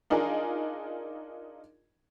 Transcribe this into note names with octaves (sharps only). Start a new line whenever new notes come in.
D4 D#4 F4 G#4 A#4